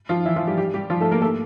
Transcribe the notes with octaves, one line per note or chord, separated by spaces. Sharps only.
F3 F4
E3 E4
F3 F4
G3 G4
G3 G4
G3 G4
F3 F4
A3 A4
A#3 A#4
A3 A4